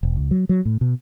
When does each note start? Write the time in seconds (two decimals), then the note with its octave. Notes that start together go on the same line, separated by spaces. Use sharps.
0.03 E1
0.16 C#2
0.31 F#3
0.49 F#3
0.65 A2
0.81 B2